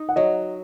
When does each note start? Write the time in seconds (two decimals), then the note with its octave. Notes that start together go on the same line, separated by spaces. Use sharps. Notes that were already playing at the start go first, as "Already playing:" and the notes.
Already playing: D#4
0.09 F#5
0.16 F#3 D#5